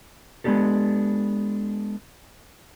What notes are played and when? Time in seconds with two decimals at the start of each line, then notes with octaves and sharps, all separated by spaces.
0.44 G#3 B3 C#4 D4 G4 A4